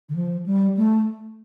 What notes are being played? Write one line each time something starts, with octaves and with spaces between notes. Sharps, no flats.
D3
F3
G3
A3